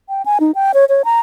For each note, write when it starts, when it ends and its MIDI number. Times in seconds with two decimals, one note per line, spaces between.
0.09 0.22 79
0.26 0.38 80
0.40 0.51 63
0.55 0.72 79
0.74 0.85 73
0.89 1.02 73
1.05 1.20 82